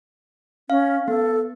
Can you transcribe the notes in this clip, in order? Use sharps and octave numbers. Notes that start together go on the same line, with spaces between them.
C#4 F5
B3 A4